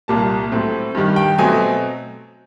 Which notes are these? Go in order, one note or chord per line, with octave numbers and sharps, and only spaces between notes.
C2 A#2 G3 A#3 A5
A2 F#3 A3 C4
G2 D#3 G3
G5
B2 F#3 A3 C4 G#5